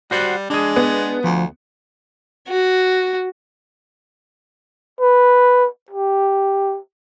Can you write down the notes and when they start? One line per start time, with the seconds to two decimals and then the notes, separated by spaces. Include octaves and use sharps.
0.11 G3 F#4 C5 F#5
0.50 G#3 D4 G#4
0.76 B3
1.24 D2 F3
2.48 F#4
5.01 B4
5.91 G4